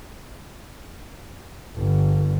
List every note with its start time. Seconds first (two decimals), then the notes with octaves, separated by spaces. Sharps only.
1.77 G1